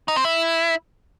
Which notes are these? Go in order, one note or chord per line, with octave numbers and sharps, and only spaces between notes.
D#4
C4
E4